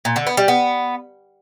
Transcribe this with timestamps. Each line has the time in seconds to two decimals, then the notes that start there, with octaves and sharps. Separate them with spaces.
0.05 A#2
0.16 D3
0.27 B3
0.37 G3
0.48 B3